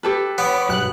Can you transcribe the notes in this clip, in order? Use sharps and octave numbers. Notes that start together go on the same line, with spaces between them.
G4 A4 B4
B3 C#5 B5 D6
B1 G2 F#3 F#6